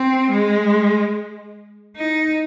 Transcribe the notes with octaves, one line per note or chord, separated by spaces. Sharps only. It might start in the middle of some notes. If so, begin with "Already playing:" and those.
Already playing: C4
G#3
D#4